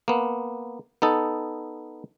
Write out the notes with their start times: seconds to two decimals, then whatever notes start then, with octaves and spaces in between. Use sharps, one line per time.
0.08 A#3 B3
1.02 B3 D#4 A4